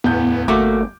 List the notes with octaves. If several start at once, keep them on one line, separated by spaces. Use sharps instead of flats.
D1 E2 B3 G6
G1 A3 A#3 F#4 D6